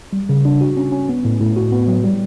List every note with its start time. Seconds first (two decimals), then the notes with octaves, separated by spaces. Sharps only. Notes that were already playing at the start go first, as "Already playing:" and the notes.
0.13 G3
0.29 C#3
0.45 D4
0.61 F#4
0.77 C#4
0.92 C#4
1.09 B3
1.25 A2
1.40 A2
1.56 F#4
1.72 B3
1.88 F#3
2.04 G3